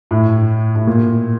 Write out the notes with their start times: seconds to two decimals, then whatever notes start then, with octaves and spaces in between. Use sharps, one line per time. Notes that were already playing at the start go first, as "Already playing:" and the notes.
0.11 A2
0.75 A2
0.87 A#2